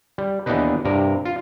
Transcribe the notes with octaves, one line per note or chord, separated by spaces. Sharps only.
G3
D#2 E3 B3 D4 D#4 B4
G2 C3 A#4
F4